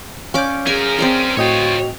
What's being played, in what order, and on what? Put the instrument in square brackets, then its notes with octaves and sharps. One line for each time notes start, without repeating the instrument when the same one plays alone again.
[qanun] C#4 D5 D6 [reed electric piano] F5 G6
[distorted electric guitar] C#4 A#4 [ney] G#4 [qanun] G#5
[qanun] C4 C5 D5
[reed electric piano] A2 D#5 G5 [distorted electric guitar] F4 C#5 [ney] F#4